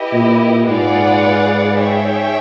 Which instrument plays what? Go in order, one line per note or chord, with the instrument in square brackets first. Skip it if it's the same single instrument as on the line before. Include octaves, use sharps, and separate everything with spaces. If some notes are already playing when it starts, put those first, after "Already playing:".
Already playing: [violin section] E4 G4 B4 D#5
[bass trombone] A#2
[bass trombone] G#2 [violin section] F4 G#4 B4 D5 F#5
[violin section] G#4 C#5 E5 G5